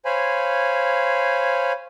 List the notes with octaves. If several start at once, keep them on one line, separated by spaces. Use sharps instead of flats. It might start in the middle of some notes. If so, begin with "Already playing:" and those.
C5 C#5 F5 G#5 B5